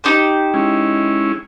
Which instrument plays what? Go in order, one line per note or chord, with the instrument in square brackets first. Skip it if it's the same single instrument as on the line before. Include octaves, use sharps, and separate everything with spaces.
[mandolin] D#4 G4 C5
[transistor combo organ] G#3 C#4 E4